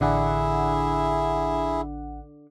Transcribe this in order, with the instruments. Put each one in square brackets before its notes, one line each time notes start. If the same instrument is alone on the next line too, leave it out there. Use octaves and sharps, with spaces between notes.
[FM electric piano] A1 D4 F#5 [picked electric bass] D3 [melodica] E4 G#4 E5